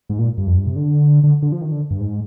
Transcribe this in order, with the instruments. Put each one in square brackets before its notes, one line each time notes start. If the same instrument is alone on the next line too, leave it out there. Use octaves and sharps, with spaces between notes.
[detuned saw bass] G#2
A#2
G2
F2
G2
C3
D3
D3
D3
F3
D#3
D3
G2
G#2